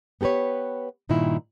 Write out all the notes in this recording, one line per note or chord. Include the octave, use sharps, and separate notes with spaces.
B3 G4 A4 B4 C#5
G2 A#2 D#3 A#3 E4